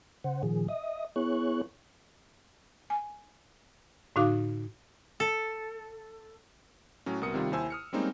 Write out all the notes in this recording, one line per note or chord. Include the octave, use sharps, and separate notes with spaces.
C#3 C5 F#5
A#2 D#3 F3 G#4
D#5 E5 D#6
B3 E4 G#4 C#5 C#6 F#6
G#5
A2 D3 D#4 F#4 F5 D6
A4
A2 F#3 C#4
C2 B2 A#4 D#6 C#7
C3 D#3 G3 F4
D#2 E4 C5 G#5 E6
D#6 F6 C#7
G3 G#3 A#3 C4 C#4 D#4